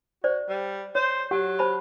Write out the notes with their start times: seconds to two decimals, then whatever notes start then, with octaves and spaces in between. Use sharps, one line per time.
0.24 F#4 C5 D5
0.49 G3
0.95 C5 C#5
1.31 F#3 G4 F#5
1.59 C5 A5 B5